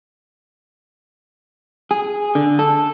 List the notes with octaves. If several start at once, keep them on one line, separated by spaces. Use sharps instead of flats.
G#4
D3
A4